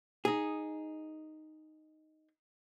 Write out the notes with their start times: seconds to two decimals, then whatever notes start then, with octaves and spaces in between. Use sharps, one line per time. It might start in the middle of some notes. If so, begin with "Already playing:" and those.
0.25 D#4 G#4